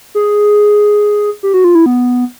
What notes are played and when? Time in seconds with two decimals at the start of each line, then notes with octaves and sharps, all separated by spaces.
0.15 G#4
1.43 G4
1.54 F#4
1.64 F4
1.75 E4
1.86 B3